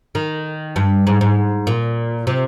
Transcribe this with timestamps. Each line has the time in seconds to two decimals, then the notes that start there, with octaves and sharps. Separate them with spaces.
0.15 D#3
0.76 G2
1.07 G#2
1.21 G#2
1.67 A#2
2.27 C3